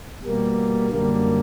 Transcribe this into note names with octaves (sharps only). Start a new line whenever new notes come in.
B2 G3 A#3
F#2 D3 G3 A#3